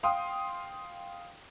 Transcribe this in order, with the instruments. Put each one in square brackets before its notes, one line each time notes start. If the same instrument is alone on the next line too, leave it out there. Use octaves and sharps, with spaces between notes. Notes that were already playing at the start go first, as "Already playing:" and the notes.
[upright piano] F5 G5 C6 D#6